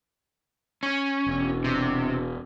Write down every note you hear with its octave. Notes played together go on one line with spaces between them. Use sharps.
C#4
E1
C3